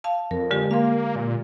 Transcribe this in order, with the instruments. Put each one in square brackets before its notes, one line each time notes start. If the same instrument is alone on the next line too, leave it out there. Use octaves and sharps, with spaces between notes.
[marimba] F5 A5
[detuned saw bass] F2 [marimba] A#4
[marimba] D3 G#3 G4
[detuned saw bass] A#3 [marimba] F5 C6
[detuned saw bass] A#2